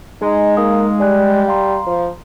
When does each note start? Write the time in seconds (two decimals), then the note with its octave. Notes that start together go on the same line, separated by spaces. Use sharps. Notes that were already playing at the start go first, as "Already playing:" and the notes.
0.22 G#3 D#4
0.57 A#3 D#4 F5 D#6
1.00 G3 D5 G#5 F#6
1.48 F5 A#5 C6
1.87 F3